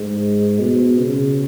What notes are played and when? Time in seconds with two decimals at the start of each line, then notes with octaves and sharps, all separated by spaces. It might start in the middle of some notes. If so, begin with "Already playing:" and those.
Already playing: G#2
0.59 B2
0.98 C#3